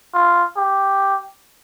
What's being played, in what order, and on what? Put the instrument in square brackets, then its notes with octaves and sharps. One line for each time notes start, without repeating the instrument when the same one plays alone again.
[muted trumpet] F4
G4